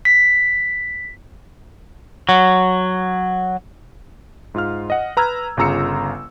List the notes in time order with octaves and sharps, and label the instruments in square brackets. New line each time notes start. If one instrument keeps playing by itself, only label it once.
[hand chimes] B6
[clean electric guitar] F#3
[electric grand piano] G#2 F4 F5 F6
D#5 F#5
B4 A#5 E6 F6 G#6
G1 C#3 F4 A#5 E6 C#7